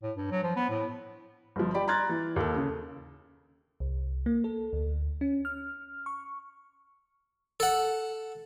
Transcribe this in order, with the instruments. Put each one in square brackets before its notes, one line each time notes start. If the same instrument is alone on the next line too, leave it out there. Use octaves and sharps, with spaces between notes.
[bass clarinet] A2
G2
F#3
F3
B3
A2
[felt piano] G1 F3
G4 D5 B5
A#5 C6 F6 F#6 G#6 A6
E3
D#2 A4
C#3
[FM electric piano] C2
A#3
A4
D2
C#4
F6
C#6
[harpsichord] A4 F#5